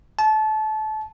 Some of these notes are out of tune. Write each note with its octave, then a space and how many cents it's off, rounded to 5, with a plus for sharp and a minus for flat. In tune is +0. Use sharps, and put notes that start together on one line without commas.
A5 -25